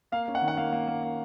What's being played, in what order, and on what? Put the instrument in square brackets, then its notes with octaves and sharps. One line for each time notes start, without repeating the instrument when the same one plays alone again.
[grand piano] A#3 F5
C#4
F#5
D#3
F#5
A#3 F5
A#3
A#3
A#3